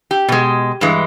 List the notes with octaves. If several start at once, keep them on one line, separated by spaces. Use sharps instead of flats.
G4
B2 G#3
G2 E3 G#3